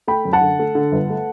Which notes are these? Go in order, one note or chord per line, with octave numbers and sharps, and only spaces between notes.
A3 G5 B5
F#2
F#5 A5
D3
A3
D3
G1
A3